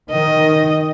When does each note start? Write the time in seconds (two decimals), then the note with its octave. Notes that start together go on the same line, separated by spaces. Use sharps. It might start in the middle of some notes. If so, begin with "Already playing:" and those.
0.10 D#3 D#5